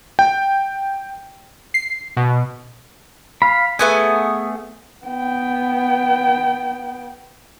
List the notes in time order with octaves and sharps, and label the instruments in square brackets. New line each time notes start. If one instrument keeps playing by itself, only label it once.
[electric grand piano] G5
[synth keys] C7
B2
[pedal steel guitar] F5 B5
[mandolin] A3 B3 G#5 [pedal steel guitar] G#4
[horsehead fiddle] B3 G5